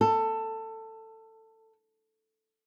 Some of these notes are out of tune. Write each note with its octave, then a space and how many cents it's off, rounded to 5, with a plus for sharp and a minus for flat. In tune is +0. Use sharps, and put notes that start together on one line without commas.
A4 +15